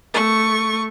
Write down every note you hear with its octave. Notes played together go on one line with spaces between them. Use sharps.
A3 C#6